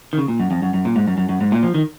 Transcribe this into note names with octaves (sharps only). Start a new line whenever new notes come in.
D#3
C#3
A#2
F#2
F2
F#2
F#2
A#2
G#2
F#2
F#2
F#2
G#2
A#2
F3
D#3